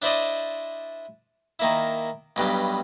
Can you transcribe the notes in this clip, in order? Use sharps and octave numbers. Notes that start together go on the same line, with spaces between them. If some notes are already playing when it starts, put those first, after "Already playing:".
D4 E4 C5 D5 D#5
D#3 A#3 E4
B1 G2 B2 G4